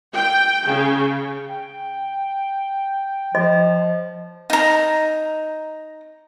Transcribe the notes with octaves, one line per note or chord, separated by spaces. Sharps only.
G5
C#3
G5
F3 D#5
D#4 A#5